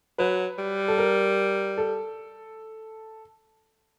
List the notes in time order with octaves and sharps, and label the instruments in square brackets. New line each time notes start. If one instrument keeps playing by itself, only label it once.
[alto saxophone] F#3 [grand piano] B4
[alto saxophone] G3
[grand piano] A4
A#4
A4